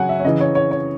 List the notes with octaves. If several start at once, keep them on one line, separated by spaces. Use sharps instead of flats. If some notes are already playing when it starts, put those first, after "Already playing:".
Already playing: C#3 F#3 F#5 G#5
E5
C#5
C#3 E3 D#5
C#5
C#5
C#5